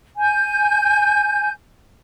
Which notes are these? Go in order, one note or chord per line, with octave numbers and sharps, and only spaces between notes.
G#5 G6